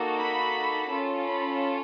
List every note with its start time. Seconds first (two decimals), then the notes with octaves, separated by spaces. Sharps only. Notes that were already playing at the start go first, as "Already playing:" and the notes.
Already playing: A#3 D#4 F#4 A4
0.21 B5
0.90 C#4 F4 A4
1.26 B5